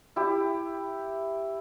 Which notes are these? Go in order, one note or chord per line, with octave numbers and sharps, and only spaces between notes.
E4 G4